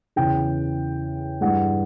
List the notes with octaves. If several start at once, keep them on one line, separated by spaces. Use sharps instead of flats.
E2 C#3 E3 G5
G2 E3 G#3 F#5